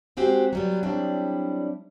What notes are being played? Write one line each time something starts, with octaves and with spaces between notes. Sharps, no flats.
G#3 C4 F#4 G4
F#3 G3 B3
F#3 G3 C4 D4 E4